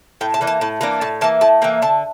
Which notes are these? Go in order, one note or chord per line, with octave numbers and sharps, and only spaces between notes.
A2 G5
A5
E3 A#3 D4
A5
A2 A5
E3 A#3 D4 A#5
A2 A5
E3 A#3 A5
A2 A5
E3 A#3 G5
D3 A5